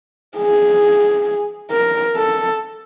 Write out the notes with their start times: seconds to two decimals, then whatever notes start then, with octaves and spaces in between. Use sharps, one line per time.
0.37 G#4
1.71 A#4
2.16 A4